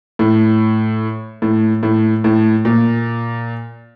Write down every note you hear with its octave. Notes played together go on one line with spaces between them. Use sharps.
A2
A2
A2
A2
A#2